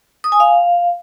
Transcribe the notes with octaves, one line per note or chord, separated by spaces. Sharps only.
D#6
G#5
F5